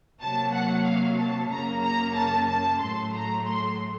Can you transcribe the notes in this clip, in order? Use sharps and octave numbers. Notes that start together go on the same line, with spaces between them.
C3 F#3 A#3 A5
F#5
F5
A5
F#2 C#3 F#3 A#3 A#5
A#5
A5
A5
A2 F#3 A3 C6
A#5
C6